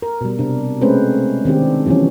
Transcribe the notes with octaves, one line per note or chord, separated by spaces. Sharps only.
A#4
B2 G3
C3 D4
G#3 A3 C4 C#4 B4 C5
D#3 C4 D4 G4
E3 F3 G3 B3 C#4